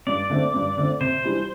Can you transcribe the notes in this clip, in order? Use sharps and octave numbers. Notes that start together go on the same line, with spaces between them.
G2 D5
D3 A3 C4
G2
D3 A3 C4
C3 C5
E3 G3 D4